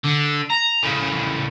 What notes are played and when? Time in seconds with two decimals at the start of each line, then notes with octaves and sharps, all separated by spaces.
0.04 D3
0.50 A#5
0.83 A2 C#3